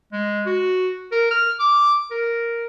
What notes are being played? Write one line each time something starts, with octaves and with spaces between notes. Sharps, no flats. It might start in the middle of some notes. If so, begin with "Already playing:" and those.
G#3
F#4
A#4
F6
D6
A#4